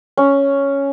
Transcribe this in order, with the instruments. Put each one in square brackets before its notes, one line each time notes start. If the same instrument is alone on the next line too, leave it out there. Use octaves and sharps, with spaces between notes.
[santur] C#4